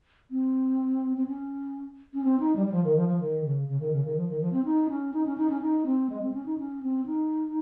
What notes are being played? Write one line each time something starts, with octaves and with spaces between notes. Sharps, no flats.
C4
C4
C#4
C#4
C4
D#4
G3
G3
F3
D#3
F3
F3
D#3
C#3
C#3
D#3
C#3
D#3
F3
D#3
F3
C4
D#4
C#4
D#4
C#4
D#4
C#4
D#4
C4
G#3
C4
C#4
D#4
C#4
C4
D#4